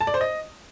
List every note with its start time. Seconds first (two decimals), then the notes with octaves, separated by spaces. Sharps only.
0.01 A5
0.07 D5
0.14 C5
0.21 D#5